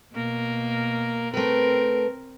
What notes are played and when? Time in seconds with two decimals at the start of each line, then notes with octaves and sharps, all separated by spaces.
0.12 B2 A#3 A#4
1.34 A3 C4 A#4 B4